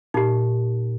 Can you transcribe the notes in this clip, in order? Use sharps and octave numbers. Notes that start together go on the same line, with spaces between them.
A#2 D#4 G4